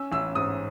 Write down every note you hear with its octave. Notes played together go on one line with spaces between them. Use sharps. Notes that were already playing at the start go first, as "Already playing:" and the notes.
Already playing: C#4 E6
A1 E6
G#2 D#6